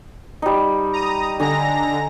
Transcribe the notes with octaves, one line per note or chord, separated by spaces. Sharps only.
G3 D#4
A#5 D#6
D3 G#5 A#5 D#6 A#6